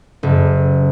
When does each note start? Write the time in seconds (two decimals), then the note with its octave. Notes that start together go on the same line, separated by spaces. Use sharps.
0.23 F#1